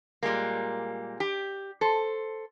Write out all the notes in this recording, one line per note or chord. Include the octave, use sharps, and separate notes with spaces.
A#2 G3 G#3 A#3
G4
A4 C5